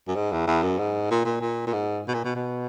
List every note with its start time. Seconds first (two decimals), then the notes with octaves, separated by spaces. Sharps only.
0.08 F#2
0.16 G#2
0.32 E2
0.47 E2
0.63 F#2
0.79 G#2
1.11 A#2
1.25 A#2
1.41 A#2
1.67 A#2
1.73 G#2
2.08 B2
2.14 A#2
2.25 B2
2.36 B2